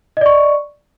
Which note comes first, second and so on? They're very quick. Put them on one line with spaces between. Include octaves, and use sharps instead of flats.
D#5 D5 C#6